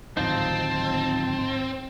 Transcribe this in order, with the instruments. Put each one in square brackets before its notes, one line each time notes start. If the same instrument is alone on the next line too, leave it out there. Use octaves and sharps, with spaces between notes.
[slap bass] D1 G#1 F3 [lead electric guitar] C4 [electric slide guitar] D#4 F4 [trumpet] A5